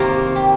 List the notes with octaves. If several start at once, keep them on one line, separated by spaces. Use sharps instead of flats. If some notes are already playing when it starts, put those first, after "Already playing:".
Already playing: C3 D#3 A#3 F4
G4